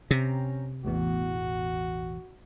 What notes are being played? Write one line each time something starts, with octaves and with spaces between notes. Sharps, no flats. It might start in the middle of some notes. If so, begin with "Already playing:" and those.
C3 C#4 G5 A#5
A1 E2 B2 F#4